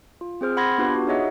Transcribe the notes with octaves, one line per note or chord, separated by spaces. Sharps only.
F4
C4 G#4 C5 F6
F#5 B5 C6 G#6 A#6
B3 D4 F4 G4 B4
F#4
D#4 G#4 C#5 D#5 E5 F#5